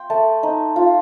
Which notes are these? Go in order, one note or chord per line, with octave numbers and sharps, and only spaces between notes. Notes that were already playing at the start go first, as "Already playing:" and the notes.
Already playing: G5 C6
A3 A5
D#4
F4